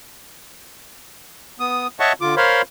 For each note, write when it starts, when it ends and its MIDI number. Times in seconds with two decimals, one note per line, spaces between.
1.60 1.87 59
1.60 1.87 87
2.00 2.13 73
2.00 2.13 75
2.00 2.13 76
2.00 2.13 78
2.00 2.13 81
2.00 2.13 85
2.21 2.35 50
2.21 2.35 65
2.21 2.35 86
2.37 2.62 70
2.37 2.62 72
2.37 2.62 73
2.37 2.62 77
2.37 2.62 83
2.37 2.62 84